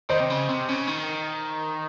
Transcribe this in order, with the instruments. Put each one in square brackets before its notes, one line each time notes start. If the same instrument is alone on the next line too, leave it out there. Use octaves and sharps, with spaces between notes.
[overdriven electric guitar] D#3 [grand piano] C5 D#5
[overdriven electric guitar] C3
C#3
C3
C#3
D#3